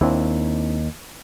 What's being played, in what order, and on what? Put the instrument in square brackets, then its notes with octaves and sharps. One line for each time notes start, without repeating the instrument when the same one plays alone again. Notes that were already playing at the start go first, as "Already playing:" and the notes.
[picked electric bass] D#2 [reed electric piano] C4 D4 E4